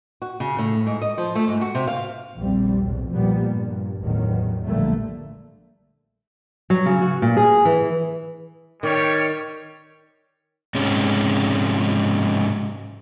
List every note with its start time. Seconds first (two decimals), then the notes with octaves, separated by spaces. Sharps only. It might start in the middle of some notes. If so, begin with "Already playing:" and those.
0.22 F#4
0.40 C#3
0.58 A2
0.87 G#2
1.02 D#5
1.18 F3
1.35 A3
1.48 G#2
1.61 F#4
1.75 C3
1.88 F5
2.36 A#1 E2 G3 C4
2.82 B1 E2 A2
3.11 A#2 F3 G3 A#3 B3
3.49 G2 A#2
4.01 A1 E2 A2 D#3 F#3
4.64 A#1 D3 G3 A3 A#3
6.70 F#3
6.86 C#3
7.02 F#4
7.22 A#2
7.37 G#4
7.65 E3
8.83 D#3 G3 C#5
10.75 G#2 C3 G#3 C#4